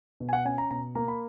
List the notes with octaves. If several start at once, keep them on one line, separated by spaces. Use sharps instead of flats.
B2
G#5
F#5
C#4 G#5
A#5
B2 A#5
A#3 A#5
B5